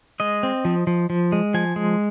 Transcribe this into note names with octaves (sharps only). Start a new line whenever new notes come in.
G#3 D#5
C4
F3
F3
F3
G#3
F3 G#5
G#3